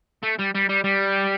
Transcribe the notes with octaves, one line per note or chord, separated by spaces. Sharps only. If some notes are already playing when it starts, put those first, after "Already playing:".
A3
G3
G3
G3
G3